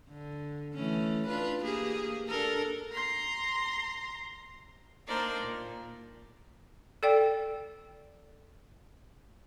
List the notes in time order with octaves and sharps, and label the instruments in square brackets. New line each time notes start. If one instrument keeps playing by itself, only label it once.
[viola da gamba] D3
E3 A3 C#4
D4 F4 B4
A#3 G4 G#4
D4 A4 A#4
[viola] A#5 C6
[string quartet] A#3 D4 D#4 A#4 C5 D5
A#2
[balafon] A4 D5 G5